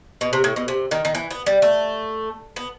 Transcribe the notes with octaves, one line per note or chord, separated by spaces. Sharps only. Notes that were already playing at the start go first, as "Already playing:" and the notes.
B2
C3
A2
B2
C3
D#3
D#3
E3
B3
G3
A3
B3